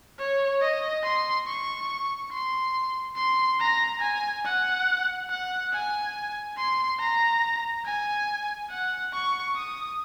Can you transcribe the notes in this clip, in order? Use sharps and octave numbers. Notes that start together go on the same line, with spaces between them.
C#5
D#5
C6
C#6
C6
C6
A#5
G#5
F#5
F#5
G#5
C6
A#5
G#5
F#5
C#6
D#6